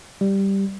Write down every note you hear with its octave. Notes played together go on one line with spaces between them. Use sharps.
G3